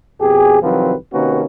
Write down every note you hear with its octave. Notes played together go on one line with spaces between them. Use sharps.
F2 B2 G4 G#4
C2 D#3 F3 F#3 C4 B4
C3 D#3 A#3 C#4 F#4 B4